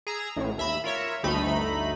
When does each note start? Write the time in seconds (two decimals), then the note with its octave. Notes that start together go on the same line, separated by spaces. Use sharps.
0.07 G#4 A#5 E6
0.36 A1 A2
0.58 D#2 E5 A#5 B5 E6
0.84 F4 A#4 C#5 E5
1.23 G1 D2 A3 D#4 B5